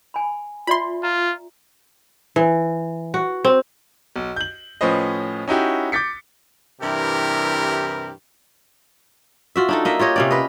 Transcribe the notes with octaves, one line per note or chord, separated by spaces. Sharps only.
G#5 B5
F4 D5 E5 B5 C6
F4 A#5
E3
F#4
C4
B1
G6 F#7
A2 F3 C#4 B4 C5 D#5
C#4 D#4 E4 F#4 G4
D6 G6 A6 B6 C#7
G2 C3 E3 E4 G4 A#4
F4 F#4 E5
D4 D#4 A4
A#3 D#5 E5
F4 G4 C#5 D#5
C3 C#4 D5
B4 D#5